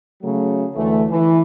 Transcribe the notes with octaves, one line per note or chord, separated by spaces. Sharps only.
C#3 F#3 A3
D2 E3 A3
E3